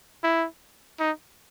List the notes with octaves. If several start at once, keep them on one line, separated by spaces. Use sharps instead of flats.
E4
D#4